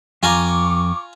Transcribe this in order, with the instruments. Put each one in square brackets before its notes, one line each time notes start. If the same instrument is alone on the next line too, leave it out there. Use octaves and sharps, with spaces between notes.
[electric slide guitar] F2 [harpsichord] F4 G#5 A#5 [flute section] C#6 D6